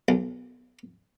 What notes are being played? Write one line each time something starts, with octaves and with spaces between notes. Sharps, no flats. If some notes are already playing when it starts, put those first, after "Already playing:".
B1